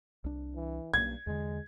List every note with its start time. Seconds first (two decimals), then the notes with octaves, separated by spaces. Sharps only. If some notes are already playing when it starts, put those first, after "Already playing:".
0.24 C2 D4
0.55 E3
0.94 B1 G2 A#3 G#6
1.27 E2 D3 G#3